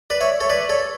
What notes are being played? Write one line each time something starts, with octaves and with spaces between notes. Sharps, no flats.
B4 D5
C#5 E5
A4 C#5
B4 D5
A4 C#5